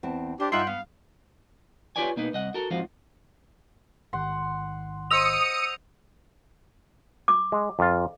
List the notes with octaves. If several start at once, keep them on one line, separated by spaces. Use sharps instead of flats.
E2 C4 A5
D4 G4 C5
G2 D#4 F4 E5 F#5 G5 C6
B3 F5
F4 G4 B4 C#5 D5 G#5
B2 A#3 D#4 B4
C2 D#5 F#5
F#4 A4 A#4
F2 G#2 F3 F#4 C5 F5
A1 G#2 D#3 F#5 C6
C5 D#5 D#6 E6 C#7 D#7 F7
D6
G#3
F2 F4